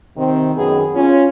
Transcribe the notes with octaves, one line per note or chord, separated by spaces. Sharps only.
C3 D#3 C4
F#2 D#3 B3 G#4
C#4 F4